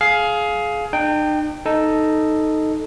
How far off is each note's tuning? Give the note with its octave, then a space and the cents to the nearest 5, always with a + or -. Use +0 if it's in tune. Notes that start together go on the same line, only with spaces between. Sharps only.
G#4 +20 F5 +5
D#4 -45 G5 +0
D#4 +0 A4 +0